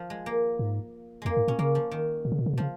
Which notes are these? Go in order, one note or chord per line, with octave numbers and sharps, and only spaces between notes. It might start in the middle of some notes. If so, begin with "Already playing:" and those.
Already playing: F3
G#3
A#3
G#2
F2 G#3 A#3
G#2
A#2 C#4
C#3 A#3
F3
D#3
A#2
C#3
A#2
C#3
A#2
C#3 F3